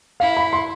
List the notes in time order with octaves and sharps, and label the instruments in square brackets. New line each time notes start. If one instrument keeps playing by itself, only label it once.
[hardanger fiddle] E4 [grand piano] F5
[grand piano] B5
C6